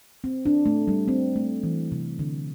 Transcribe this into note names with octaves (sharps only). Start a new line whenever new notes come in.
C4
D4
A3
G3
C4
A3
E3
C3
D3